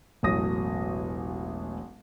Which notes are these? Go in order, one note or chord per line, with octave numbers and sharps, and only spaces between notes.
E1 A1 F#3 D#6 A#6